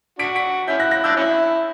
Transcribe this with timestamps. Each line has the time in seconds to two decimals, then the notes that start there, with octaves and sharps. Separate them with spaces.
0.19 D4 F#4 B6 D7
0.36 B6 D7
0.68 C#4 E4 G6 B6
0.80 F#6 A#6
0.91 F#6 A#6
1.04 D4 E6 G6
1.16 C#4 E4